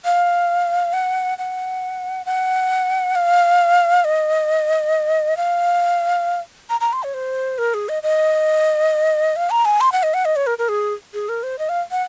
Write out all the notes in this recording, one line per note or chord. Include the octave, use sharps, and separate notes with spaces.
F5
F#5
F#5
F#5
F5
D#5
F5
A#5
A#5
C6
C#5
C5
A#4
G#4
D#5
D#5
F5
A#5
G#5
C6
F#5
D#5
F#5
D#5
C#5
A#4
A#4
G#4
G#4
A#4
C5
D#5
F5
F#5